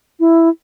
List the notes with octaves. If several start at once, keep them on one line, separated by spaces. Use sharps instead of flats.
E4